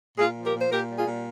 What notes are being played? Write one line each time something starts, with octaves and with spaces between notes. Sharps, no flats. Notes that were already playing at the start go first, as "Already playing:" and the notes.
A#2 F4 G#4
F3
G4 A#4
A#2
C5
A#2 G4 A#4
G3
F4 G#4
A#2